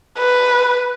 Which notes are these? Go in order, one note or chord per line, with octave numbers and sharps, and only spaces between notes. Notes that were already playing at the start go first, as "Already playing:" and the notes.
B4